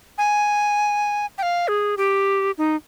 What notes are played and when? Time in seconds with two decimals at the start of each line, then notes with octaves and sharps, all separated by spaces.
0.18 G#5
1.38 G5
1.43 F5
1.68 G#4
1.97 G4
2.58 D#4